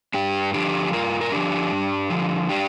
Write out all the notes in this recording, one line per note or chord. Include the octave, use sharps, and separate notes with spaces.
G2 D4 G4
D3 F3 D4 G4
G2 F4 A#4
A#4
D3 F3 D4 G4
G2
D3 F3
D4 G4